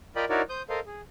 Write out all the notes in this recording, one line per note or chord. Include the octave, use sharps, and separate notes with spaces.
F4 A#4 D5 D#5 G5 B5
D#4 E4 F#4 A#4 C#5 D5
C5 D#6 G6
A4 A#4 C5 D#5 F5
G#4